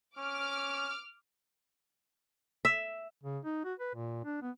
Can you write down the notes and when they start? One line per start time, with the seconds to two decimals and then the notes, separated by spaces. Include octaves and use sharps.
0.18 C#4 D6 F6
2.65 E5
3.24 C#3
3.45 D#4
3.64 F#4
3.80 B4
3.95 A#2
4.25 D4
4.42 B3